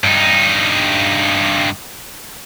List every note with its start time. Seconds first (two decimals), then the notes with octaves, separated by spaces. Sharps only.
0.04 G2 D#4